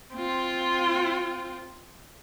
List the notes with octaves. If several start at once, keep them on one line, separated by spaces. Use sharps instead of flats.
C4 F4